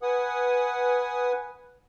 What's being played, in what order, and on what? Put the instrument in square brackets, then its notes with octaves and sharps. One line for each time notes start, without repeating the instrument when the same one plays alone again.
[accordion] B4 F#5 G#5 D#6